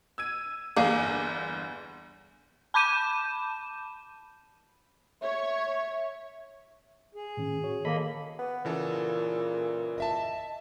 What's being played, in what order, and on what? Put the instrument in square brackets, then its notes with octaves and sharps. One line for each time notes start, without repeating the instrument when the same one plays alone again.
[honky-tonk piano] E6 G#6 D#7
[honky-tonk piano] G1 E2 [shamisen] A#3 G#4 D#5
[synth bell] A5 B5 D6 G6 D#7 E7
[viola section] C#5 [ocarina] E5
[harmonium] G#4
[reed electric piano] A2 D#3 C#4
F#4 C#5
[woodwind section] D#3 A#3 [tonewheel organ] A4 D#5 B5
[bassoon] B3
[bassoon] A#2 [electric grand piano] C#3 E3 A4
[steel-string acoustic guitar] D#5 E5 A5